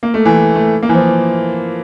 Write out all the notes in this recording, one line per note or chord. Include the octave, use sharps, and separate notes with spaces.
A#3
A3
E3
A3
A#3
E3
F3